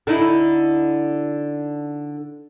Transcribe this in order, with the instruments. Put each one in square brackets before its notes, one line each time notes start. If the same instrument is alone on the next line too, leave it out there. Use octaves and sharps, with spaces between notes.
[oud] D3 D#4 E4